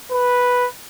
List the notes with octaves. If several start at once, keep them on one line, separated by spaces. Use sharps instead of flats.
B4